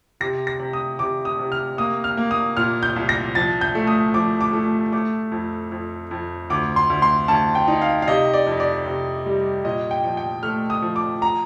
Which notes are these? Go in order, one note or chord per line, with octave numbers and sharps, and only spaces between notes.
C3 A#6
A#6
C3
D#6
C3 D6
D#6
C3
F6
A#3 D#6
F6
A#3
D#6
A#2 F6
G6
C2
A#6
F3 A6
G6
A3
D#6
F3 D6
D6
A3
A3 D6
F2
F2
F2
D2 D6
C6
D2
C6
D2 A5
G5
D#4
F5
F5
C3 D#5
D5
F2
D5
C3
G3
A#2 D#5
G5
F3
G5
A3 F6
D#6
F3
D6
A#5